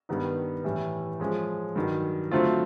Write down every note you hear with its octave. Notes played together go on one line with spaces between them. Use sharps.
G2 D#3 G3 B3 D#4
A2 E3 G3
F3 G#3 C#4
G2 D#3 F#3
D3 F#3 A3 C4 F4